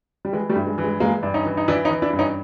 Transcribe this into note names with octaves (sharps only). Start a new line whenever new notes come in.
G3
E3 G#3
G3 A3
G2
G#3
E3
G#3
E3 G#3 A#3
G2 D4
C#4 D#4
E3
D#4
E3 D4 E4
C#4 D#4
E3
D4 E4
G2
C#4 D#4